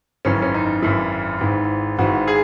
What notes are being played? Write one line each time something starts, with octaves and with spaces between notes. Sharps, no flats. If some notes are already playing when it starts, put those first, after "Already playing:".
G#1 F#2 E3 C#4
C#4
D#4
G#1 F#2 E3 E4
G#1 G#2 E3
G#1 G#2 E3 F#4
G#4